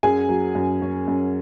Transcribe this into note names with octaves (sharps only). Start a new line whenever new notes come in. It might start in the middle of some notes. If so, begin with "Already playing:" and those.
F#2 G#4 G#5
F#3
F#2
C#4
F#2